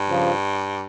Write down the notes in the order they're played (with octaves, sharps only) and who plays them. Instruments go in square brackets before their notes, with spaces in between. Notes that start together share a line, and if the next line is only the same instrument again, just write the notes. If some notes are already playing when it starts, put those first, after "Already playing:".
Already playing: [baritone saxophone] G2
[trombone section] C#3 F3